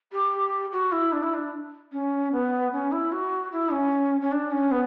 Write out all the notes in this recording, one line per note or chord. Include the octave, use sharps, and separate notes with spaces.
G4
F#4
E4
D4
E4
D4
C#4
B3
C#4
E4
F#4
E4
C#4
C#4
D4
C#4
B3